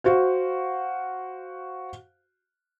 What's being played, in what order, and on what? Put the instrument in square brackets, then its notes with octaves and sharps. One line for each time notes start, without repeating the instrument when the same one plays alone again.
[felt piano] F#4 C5 F5